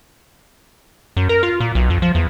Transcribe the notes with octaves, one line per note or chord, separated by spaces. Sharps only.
F#2
A#4
F4
A#2
B1
F2
F3
E2